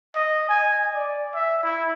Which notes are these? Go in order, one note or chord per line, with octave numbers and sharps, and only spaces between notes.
D#5
G#5
D5
E5
E4